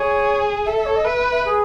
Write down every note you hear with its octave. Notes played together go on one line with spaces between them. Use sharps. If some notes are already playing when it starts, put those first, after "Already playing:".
Already playing: G#4 C#5
A4 E5
E5
C#5
D#5
B4 E5
E5
G#4